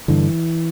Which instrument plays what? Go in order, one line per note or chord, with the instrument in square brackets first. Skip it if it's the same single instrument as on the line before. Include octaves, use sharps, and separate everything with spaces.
[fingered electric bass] G2 D3 E3